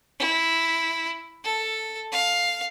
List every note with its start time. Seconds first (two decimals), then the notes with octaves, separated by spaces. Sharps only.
0.19 E4
1.44 A4
2.12 F5